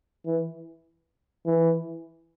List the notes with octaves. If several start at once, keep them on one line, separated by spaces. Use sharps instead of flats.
E3
E3